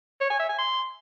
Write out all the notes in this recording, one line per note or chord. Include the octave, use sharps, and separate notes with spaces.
C#5
G#5
E5
G#5
C6